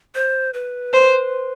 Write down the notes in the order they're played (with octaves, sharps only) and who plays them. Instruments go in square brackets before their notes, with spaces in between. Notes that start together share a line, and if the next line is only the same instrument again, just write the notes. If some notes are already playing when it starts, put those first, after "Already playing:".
[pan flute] C5
B4
[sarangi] C5